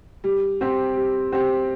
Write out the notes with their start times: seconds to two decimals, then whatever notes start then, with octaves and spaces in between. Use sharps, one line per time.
0.24 G3
0.61 C4 G4
0.96 G3
1.32 C4 G4